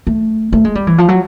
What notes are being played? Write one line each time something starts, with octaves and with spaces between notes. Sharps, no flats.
A3
A3
G#3
G3
E3
F3
F#3